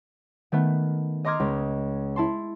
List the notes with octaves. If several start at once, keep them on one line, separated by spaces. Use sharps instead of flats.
D#3 A3 B3
D#5 A#5 C6 D6 F6 G#6
C#2
E4 A5 C6